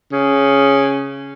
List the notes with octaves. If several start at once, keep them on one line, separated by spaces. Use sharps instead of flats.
C#3